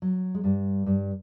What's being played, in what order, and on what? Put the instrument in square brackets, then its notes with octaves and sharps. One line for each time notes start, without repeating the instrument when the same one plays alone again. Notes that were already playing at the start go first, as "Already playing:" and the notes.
[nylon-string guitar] F#3
G#3
G2 G3
G2 G3